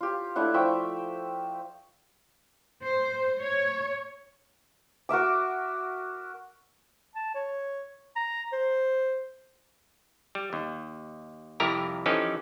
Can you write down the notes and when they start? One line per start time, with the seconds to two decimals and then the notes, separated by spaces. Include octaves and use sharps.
0.01 F4 G4
0.36 A3 D4 E4 F#5
0.54 F3 E5 G5 C#6
2.84 C5
3.41 C#5
5.09 F#4 A#4 E5 D6
7.15 A5
7.35 C#5
8.16 A#5
8.52 C5
10.35 G3
10.53 D#2
11.60 C2 F2 E4 G4 A#4 A#5
12.06 E3 F3 C#4 D#4 G4 A4